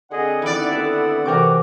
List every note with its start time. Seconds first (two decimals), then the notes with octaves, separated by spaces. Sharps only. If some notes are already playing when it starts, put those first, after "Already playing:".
0.11 D3 C4 G#4 D#5 F#5
0.42 D#3 B3 E4 D5
0.72 A4
1.25 C3 E3 F#4 A#4 G5 D6